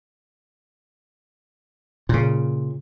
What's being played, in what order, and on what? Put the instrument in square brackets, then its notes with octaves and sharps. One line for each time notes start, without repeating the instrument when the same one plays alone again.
[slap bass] A#2 C#3